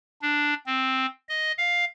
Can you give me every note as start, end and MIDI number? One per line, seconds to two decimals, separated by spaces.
0.22 0.54 62
0.67 1.06 60
1.29 1.52 75
1.58 1.85 77